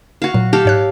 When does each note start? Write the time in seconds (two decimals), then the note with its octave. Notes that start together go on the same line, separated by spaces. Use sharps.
0.22 F#4 F5
0.34 A#2 F#3
0.53 G4 A4 F5
0.65 G#2 C#5 F#6